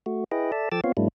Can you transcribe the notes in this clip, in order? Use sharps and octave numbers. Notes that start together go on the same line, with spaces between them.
A3 F#4
E4 G#4 B4 D#5 G5
A4 D5 E5 A5
F3 A4 G5 D6 E6 A6
B3 C4 F4 C#5 F5
G#2 F#3 G#3 A#3 D4 E4